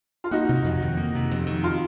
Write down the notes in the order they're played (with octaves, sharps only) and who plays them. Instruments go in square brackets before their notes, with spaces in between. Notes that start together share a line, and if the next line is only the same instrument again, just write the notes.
[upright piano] F4
[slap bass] A#3 [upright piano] D#4 F#4
[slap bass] C3
F2
D#3
A#3
C3
F2
D#3
[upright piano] F4